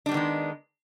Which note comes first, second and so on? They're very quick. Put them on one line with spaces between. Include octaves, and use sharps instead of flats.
D4 G3 B3 D#3 G#3